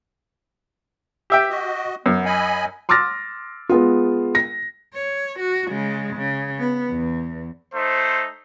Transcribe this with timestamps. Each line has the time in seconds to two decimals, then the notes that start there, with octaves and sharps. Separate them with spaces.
1.30 G4 E5 G5
1.50 F#4 D#5
2.06 F#2 B3
2.25 D#5 G#5 B5
2.89 C6 D6 E6 F6 A6 A#6
3.69 G#3 B3 F4
4.35 A#6
4.95 C#5
5.39 F#4
5.70 C#3 G#3
6.16 C#3
6.59 B3
6.89 E2
7.74 A3 D#4 C5